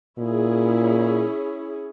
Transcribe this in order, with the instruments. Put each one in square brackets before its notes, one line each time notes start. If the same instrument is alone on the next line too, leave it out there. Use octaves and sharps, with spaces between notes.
[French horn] A#2 [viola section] C#4 E4 G#4